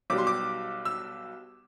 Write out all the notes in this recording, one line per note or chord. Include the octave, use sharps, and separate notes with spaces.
B1 B2 G3 D6
C6
D6
E6